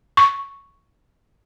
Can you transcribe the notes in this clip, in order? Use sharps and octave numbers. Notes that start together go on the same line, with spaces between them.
C#6